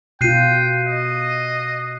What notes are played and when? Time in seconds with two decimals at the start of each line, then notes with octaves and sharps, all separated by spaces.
0.21 B2 F4 G5 F#6 C7 D#7
0.87 D#5